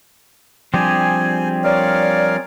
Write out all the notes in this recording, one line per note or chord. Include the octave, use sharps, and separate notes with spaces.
F3 G3 C4 D4 G4 G#4 G#5
A#4 C#5 D5 F5